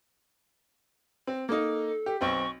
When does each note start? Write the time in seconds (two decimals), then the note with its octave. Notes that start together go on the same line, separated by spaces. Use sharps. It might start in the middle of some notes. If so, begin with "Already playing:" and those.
1.27 C4
1.49 A#3 D#4 A4
2.06 G4
2.21 B1 C4 G5 C#6